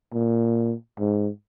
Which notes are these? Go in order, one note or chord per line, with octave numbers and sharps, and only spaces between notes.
A#2
G#2